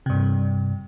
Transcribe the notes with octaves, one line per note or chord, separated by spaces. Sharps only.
G2 C3